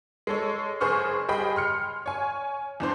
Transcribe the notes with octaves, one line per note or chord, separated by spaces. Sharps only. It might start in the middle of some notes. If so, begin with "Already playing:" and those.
G#3 A4 C#5
F#1 G#4 B4 C5 C#6 F6
G3 G#4 D#5 G5 B5
C6 F6 C#7
C#5 G#5
E2 D4 C5 C6